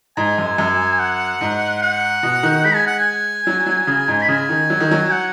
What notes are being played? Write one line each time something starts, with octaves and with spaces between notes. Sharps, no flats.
G#2 G#5
F#2
F#2
F#5
G#2
F#5
B2
D#3
G#3 B5
G#5
F#5
G#5
F#3
F#3
C#3
G#2
B5
C#3 G#5
D#3
F#3
D#3
F#3
F#5